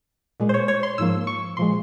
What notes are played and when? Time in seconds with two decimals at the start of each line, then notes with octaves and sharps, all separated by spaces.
0.40 A#2 G#3
0.49 C5
0.54 C#5
0.68 C#5
0.83 C6
0.98 G#2 F3 A#3 E6
1.27 C#6
1.57 A#2 F3 G#3 C6